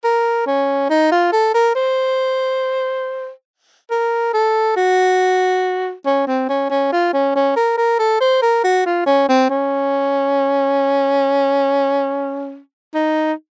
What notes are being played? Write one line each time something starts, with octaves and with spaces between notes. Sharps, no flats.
A#4
C#4
D#4
F4
A4
A#4
C5
A#4
A4
F#4
C#4
C4
C#4
C#4
F4
C#4
C#4
A#4
A#4
A4
C5
A#4
F#4
F4
C#4
C4
C#4
D#4